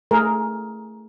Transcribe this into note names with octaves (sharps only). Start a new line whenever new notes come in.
A3 G#4 A#4